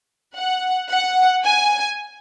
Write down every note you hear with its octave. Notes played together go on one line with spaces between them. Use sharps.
F#5
F#5
G#5